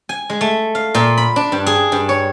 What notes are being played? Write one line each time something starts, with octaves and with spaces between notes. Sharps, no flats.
G#5
G#3
A3
F5
A#2
B5
D4
G2
G#4
G2
C#5